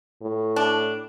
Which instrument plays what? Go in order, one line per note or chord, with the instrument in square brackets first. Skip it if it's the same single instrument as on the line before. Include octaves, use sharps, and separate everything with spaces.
[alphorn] A2
[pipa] D4